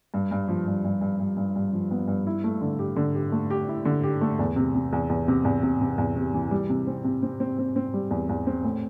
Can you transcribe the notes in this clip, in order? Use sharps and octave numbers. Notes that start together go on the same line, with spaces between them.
G2
G2
F3
G2
G2
G2
G2
G2
G2
F3
B3
G2
E4
A3
D3
G4
D3
G4
A3
G4
E4
D3
G4
A3
E2
C3
C3
E2
E2
C3
E2
C3
C3
E2
C3
E3
G3
C3
C4
C3
C4
C4
C4
C4
G3
E2
E2
C4
A2